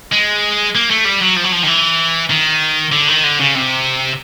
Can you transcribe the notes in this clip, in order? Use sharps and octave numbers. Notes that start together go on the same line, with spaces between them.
G#3
A#3
A3
G3
F#3
F3
F#3
F3
D#3
E3
D#3
D3
D#3
D3
C#3
C3